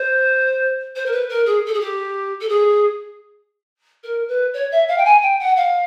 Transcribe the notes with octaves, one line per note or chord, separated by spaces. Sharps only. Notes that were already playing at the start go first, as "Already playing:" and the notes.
Already playing: C5
C5
A#4
B4
A#4
G#4
A4
G#4
G4
A4
G#4
A#4
B4
C#5
E5
F5
G5
G#5
G5
F#5
F5